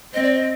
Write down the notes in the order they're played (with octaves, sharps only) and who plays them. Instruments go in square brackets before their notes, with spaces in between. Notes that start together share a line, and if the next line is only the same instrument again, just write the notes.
[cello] C4 [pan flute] D#5
[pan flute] D5
D#5